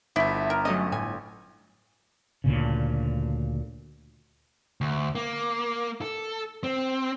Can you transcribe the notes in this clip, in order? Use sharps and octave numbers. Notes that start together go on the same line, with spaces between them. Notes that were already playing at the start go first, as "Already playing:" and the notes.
G1 A3 E4
A#4
F#3 A3 C#4 D#5
A2 G#5
D2 A#2 C#3
D2
A#3
A4
C4